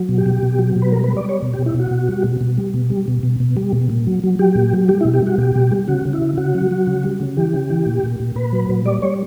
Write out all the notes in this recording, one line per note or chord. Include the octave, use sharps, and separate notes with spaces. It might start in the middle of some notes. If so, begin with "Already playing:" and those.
Already playing: F#3
B2
G4
B2
B2
F#3
B2
B4
G3 A#4
B4
G3
D5
G3 C#5
B2
G4
B2
E4
B2
F#4
B2
G3
B2
B2
G3
B2
G3
B2
B2
B2
G3
B2
A#2
F#3
F#3
F#3 G4
A#2
F#3
G3 G4
E4
B2
G4
G3 F#4
B2 G4
B2
G3
C#3 F#4
C#3
E4
C#3
C#3 F#4
F#3
F#3
C#3
G3
C#3
E3 G4
C#3
E3
A#2
A#2
A#2
A#2 B4
F#3
A#2
G3 D5
G3 C#5